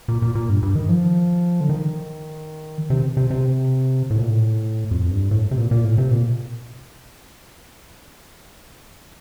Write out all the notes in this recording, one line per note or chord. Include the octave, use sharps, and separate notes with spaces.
A#2
A#2
A#2
G2
G2
D#3
F3
D3
D#3
C3
C3
C3
A2
A#2
A2
F2
G2
A2
C3
A#2
A#2
A2
C3
A#2